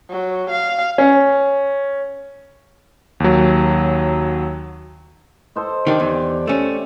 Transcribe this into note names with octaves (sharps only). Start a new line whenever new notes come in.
F#3
F5
C#4
D#2 F#3
A4 C5 D#5
D#3 D4 G4 D5
E2
A3 C#4